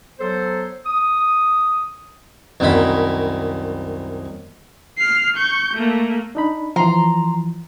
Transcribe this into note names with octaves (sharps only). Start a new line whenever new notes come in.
F#3 B3 A4 C5
D#6
C2 F#2 D#3 B5
F6 C7
C#6 G6
A3 A#3
D4 D#4 B5
E3 F3 A#5 C6